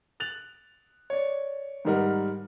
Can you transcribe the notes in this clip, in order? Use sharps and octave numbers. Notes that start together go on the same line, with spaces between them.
F#6 A6 F7 F#7
C#5 D5
G#2 D#3 G3 A#4 D#5 F#5